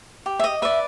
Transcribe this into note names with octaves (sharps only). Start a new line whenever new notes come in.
G4
E5
D#5
B4 D5 E5